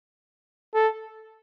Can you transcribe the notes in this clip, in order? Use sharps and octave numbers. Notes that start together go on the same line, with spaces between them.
A4